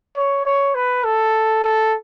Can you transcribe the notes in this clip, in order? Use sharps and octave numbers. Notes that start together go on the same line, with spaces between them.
C#5
C#5
B4
A4
A4